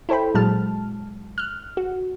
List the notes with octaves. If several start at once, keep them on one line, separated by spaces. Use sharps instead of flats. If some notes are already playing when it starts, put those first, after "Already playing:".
E4 A4 C5 G5 B5
A#2 F#3 G#3 A5 F6
F6 F#6
F#4